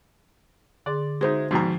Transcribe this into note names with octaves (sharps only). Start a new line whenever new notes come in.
D3 G#4 D5 C6
G#3 D#4 F#4 C5 E5
G#2 B2 D#3 F3 D5 A#5 G6